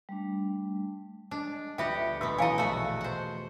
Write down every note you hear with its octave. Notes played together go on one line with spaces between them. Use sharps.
G3 A3 D4
G#3 D4 D5
D2 G3 B3 F4 G4 E5 F#5 G5
D#1 B1 B2 A3 B3 F#4 E6
E3 E4 F4 A4 C#5 D#5 F5 G#5
E1 A#1 A3 F#4 C#7
C5 F#5 A5